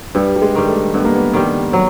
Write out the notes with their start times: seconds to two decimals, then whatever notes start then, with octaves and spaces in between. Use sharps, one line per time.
0.15 G2 G3
0.36 G3
0.42 G#3
0.55 D#3 G3
0.68 A3
0.94 G2 B3
1.05 A#3
1.16 B3
1.34 D#3 G3
1.73 F#3